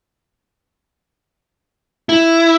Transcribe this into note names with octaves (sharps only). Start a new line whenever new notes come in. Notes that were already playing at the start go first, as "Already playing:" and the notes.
E4